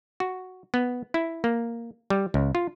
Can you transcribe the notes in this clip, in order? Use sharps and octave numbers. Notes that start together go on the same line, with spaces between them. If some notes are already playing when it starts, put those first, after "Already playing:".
F#4
B3
E4
A#3
G3
C#2
F4